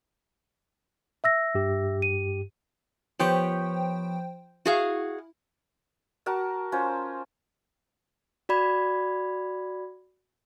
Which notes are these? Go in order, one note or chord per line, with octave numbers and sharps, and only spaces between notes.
E5 E6 A#6
G2 G4
D#7
F3 B3 G4 C5 C#5 G5
E4 F#4 G#4 F5
F#4 A#4 A5
C#4 F4 C5
F#4 D5 B5 G#6